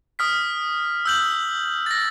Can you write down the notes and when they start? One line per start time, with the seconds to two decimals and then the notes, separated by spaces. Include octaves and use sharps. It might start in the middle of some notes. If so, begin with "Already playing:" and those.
0.19 D#6 F6 B6
1.05 E6 G6 F#7
1.86 A6 A#6